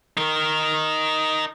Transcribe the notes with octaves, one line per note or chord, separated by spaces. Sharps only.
D#4 A#4